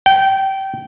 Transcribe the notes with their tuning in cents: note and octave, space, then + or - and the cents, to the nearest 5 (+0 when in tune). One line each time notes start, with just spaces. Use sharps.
G5 -20